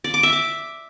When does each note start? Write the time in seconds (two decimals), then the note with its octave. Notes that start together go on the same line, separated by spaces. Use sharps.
0.04 D5
0.14 D6
0.23 E5
0.33 D6